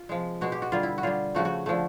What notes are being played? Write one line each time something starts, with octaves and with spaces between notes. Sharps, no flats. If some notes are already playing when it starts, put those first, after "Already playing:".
Already playing: F4
C3 F3 G#3
B2 G#3 F#4
G4
F#4
D3 G3 F4
E4
F#4
D3 G3 F4
C#3 F3 A3 F#4
F#4
D3 F3 A3